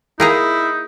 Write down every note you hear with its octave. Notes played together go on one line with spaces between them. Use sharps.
A#3 D#4 E4 G#4 A#5